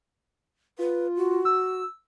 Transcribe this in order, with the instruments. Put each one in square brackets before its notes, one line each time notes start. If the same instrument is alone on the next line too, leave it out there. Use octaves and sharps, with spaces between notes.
[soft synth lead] F4 [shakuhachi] B4
[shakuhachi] F#4
[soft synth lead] E6